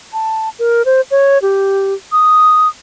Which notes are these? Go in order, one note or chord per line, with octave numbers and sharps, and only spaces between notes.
A5
A#4
C5
C#5
G4
D#6